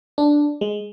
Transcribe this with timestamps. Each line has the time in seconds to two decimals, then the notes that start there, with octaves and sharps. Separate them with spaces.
0.18 D4
0.61 G#3